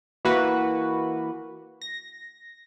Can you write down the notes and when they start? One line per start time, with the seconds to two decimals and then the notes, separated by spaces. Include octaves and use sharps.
0.25 E3 A#3 F#4 B4
1.81 A#6